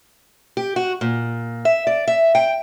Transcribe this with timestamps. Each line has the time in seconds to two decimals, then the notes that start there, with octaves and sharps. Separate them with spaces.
0.57 G4
0.76 F#4
1.01 A#2
1.65 E5
1.87 D5
2.08 E5
2.35 G5